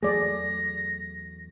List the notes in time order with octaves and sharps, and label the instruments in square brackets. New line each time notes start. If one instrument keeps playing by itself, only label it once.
[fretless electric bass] E2 F#3 A3 [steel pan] G#4 D5 [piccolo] A#6